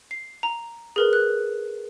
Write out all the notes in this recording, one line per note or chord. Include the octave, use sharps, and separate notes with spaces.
C7
A#5
G#4 A#4 B4
F#6